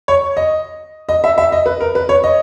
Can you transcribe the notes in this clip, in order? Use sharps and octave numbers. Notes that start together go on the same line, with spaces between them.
C#5
D#5
D#5
E5
E5
D#5
B4
A#4
B4
C#5
D#5